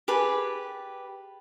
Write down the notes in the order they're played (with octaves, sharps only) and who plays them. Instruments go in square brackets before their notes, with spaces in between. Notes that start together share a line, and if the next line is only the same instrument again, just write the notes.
[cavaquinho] G4 G#4 B4 A5